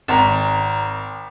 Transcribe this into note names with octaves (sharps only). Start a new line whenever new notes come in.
G#1 A#5